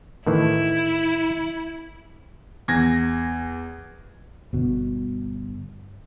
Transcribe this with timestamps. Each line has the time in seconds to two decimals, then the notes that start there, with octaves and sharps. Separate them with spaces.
0.26 A2 D#3 E3 E4
2.68 E2 G#6 A#6
4.53 G1 B2